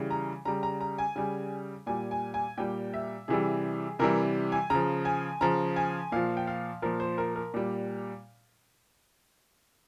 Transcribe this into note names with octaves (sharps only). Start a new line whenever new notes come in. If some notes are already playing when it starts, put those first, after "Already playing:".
Already playing: C#3 E3 G3
A#5
C#3 G3 A#5
A#5
A#5
G#5
C#3 G3 G#5
A#2 G3 G#5
G#5
G#5
A#2 G3 G5
E5
C3 E3 G3 G#4
C3 E3 G3 A#4
G#5
C#3 F3 A#5
G#5
C#3 F3 A#5
G#5
A#2 F3 F5
G5
F5
A#2 F3 A#4
C5
A#4
A#4
A#2 G3